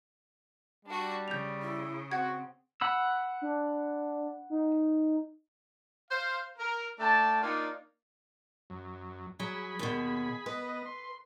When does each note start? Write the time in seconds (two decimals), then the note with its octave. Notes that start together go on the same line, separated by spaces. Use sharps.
0.85 G3 D4 F#4
1.28 C#3 G6 F7
1.61 E4
2.11 C4 F#4 F#5 G#6
2.81 F#5 B5 E6
3.42 D4
4.50 D#4
6.11 C5 F5
6.59 A#4
6.99 A3 D4 G5 A5
7.42 A#3 D4 D#4 F4 D5
8.70 F#2
9.40 F#3 G#4 B5
9.79 D#2 B2
10.46 B3 B4 D#5
10.86 C6